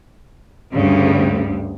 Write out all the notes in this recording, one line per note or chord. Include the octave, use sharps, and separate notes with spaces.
D2 G2 C#3